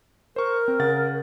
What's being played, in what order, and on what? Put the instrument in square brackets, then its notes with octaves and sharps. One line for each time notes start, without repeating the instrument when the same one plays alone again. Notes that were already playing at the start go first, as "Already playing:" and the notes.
[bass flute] A#4 [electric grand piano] C5 C#6
[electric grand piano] C4
C#3 F#5 A6